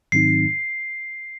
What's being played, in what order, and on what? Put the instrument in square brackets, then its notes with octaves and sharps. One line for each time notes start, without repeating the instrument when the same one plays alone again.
[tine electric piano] G#2 D#3 F#3 C4 D#4 [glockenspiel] C7